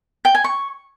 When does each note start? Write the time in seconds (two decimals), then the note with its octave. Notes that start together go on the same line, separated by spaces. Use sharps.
0.25 G5
0.35 G#5
0.44 C#6